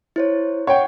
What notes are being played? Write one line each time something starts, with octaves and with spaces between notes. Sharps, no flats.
E4 C5 C#5
C#5 F#5 G5